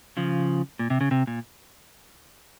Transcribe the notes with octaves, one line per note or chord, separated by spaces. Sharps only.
C#3 F3
A#2
C3
C#3
C3
A#2